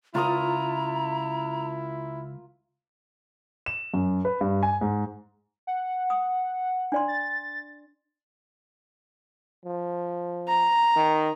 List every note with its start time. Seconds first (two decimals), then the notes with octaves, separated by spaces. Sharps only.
0.15 C#2 E4 F4 A#4 A#5 D#6
3.66 E7
3.94 F#2
4.25 B4
4.41 G2
4.63 G#5
4.81 G#2
5.67 F#5
6.10 D#6
6.92 D4 D5 C6
7.08 A6
9.65 F3
10.48 A#5
10.96 D#3